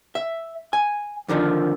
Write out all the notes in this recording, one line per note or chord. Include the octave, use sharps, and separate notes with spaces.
E5
G#5
F2 D3 D#3 F3